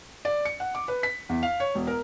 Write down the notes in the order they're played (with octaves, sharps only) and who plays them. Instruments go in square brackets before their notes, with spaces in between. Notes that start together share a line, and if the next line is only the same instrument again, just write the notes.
[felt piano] D5
C#7
F#5
D6
B4
B6
E2
F5
C#5
E1
A#4